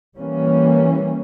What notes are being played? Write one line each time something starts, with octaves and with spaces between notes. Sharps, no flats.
E3 G3 A#3 C#4